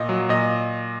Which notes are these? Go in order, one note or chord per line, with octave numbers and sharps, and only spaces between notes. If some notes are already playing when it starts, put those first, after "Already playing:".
Already playing: A#2 D#5
F#3
A#2 D#5